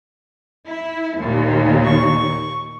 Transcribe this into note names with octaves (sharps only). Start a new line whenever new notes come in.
E4
D#2 A#2
C#6